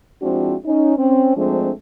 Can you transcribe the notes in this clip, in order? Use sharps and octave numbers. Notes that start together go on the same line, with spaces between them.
F3 G#3 C4 D4 E4 F#4
C#4 D#4
C4 C#4
F3 G#3 A3 C4 D4